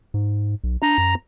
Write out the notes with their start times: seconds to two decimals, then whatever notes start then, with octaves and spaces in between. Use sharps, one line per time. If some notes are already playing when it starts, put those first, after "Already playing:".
0.14 G#2
0.64 B1
0.82 D4 A#5
0.98 F#2